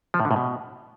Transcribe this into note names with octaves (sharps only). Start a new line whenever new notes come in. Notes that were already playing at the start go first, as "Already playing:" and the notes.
F3
A2
D3
A2
B2